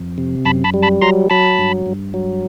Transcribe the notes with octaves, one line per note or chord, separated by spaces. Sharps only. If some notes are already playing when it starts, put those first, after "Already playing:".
Already playing: F2
C3
F#2 A5 B5
A5 B5
G3
A5 B5
F#3 A#5 C6
F#3 A5 B5
G2
G2
F#3